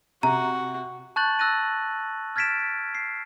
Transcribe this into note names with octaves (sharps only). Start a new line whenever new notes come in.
C3 F#4 A#5
A5 C#6 F#6 G6 A6 F#7
E6 F#6 A6 A#6 D#7
F6 G#6 A6 B6 D7 E7
C7